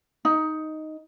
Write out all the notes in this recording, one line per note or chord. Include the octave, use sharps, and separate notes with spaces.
D#4